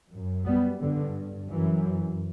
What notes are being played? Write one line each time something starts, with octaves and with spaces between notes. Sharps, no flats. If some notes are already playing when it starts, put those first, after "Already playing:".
F#2
G3 B3
G2 D3
F#2 E3